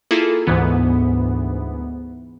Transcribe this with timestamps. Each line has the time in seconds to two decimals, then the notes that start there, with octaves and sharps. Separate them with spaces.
0.11 A#3 E4 F4 G#4 A4
0.47 D2 G#2 E3 B3